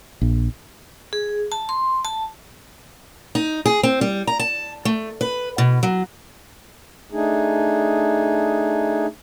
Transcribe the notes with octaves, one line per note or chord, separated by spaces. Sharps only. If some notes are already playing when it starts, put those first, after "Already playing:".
A#1
G#4
A5
C6
A5
D#4
G#4
C4
G3
A#5
A5
A3
B4
B2
F#3
A3 D4 D#4 G#4